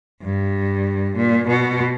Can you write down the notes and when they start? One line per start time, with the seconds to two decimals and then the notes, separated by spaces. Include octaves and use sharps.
0.22 G2
1.16 A#2
1.48 B2